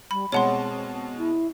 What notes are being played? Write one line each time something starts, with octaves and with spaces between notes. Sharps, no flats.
G3 B5
B2 G#3 C4 C#5 F#5 A5 C6
E4